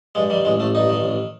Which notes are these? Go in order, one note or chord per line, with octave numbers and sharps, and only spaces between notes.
G2 G#3
D#3 G3
A1 G#3
A1 A3
G2 D#4
D#3
A1